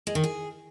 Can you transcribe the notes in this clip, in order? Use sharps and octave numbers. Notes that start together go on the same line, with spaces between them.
G#3
D#3
G#4